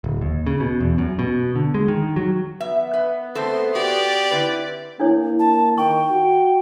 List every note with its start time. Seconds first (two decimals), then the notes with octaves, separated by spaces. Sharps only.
0.04 D1
0.21 D#2
0.47 C#3
0.60 B2
0.80 E2
0.98 F#2
1.19 B2
1.55 D3
1.74 G#3
1.88 D#3
2.16 F#3
2.60 B3 E5
2.93 B4
3.35 A3 C4 A4 C5 C6
3.75 F#4 G4 D5
4.31 D3 C4 E4 B4
5.00 A#3 D4 E4 C#5
5.39 A5
5.77 D#3 G5 C#6
6.11 F#4